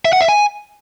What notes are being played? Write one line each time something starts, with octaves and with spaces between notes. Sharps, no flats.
E5
F#5
E5
G#5